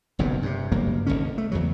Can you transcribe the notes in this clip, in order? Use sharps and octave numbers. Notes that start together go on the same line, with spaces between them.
F#1 B1 G2 A#2
G2 C3
F#1 G2 F#3 A#3
F1 C2 D3 C#4
A3
E2 C#3 F#3